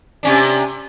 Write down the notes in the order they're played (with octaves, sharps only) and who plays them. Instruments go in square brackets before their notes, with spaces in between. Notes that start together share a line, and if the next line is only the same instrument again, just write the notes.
[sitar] C3 C#4 D4